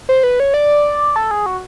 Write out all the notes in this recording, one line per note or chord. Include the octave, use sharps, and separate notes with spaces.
C5
B4
C#5
D5
A4
G#4
F#4